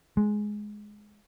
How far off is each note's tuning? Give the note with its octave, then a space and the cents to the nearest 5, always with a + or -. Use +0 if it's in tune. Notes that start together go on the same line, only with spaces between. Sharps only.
G#3 +10